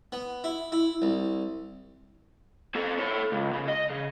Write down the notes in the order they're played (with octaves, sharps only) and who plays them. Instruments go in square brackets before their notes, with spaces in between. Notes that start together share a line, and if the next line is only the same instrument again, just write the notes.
[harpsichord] B3
E4
E4
C2
[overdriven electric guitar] C4 A4
A4 C#5
C#2
C#3
D#5
C#3